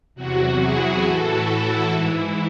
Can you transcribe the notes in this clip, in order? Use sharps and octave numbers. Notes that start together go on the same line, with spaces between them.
E2 C3 F#3 F#4
E4 G#4
A2 E3 F#4 A4
E4
E4
G#2 E3 E4